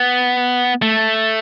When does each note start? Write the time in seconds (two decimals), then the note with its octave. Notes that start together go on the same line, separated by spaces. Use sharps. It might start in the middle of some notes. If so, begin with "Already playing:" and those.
Already playing: B3
0.82 A3